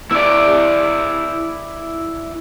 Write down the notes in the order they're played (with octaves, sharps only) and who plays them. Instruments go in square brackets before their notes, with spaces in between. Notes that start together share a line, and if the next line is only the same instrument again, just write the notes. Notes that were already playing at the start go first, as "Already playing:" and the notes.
[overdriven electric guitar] E4 D5